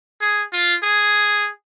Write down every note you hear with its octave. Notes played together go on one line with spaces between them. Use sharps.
G#4
F4
G#4